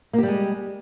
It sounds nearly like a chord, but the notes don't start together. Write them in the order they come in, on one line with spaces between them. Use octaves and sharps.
A#3 G4 G3 G#3